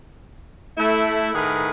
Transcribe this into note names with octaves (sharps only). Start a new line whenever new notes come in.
A3 E4
A2 D#3 G#4 A#4 B4 F#5